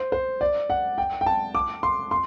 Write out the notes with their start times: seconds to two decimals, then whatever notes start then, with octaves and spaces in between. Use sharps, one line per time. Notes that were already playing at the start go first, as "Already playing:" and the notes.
Already playing: C5
0.12 C5
0.41 D5
0.70 F#5
0.98 G5
1.21 G5
1.26 A5
1.55 D6
1.83 C6
2.11 C6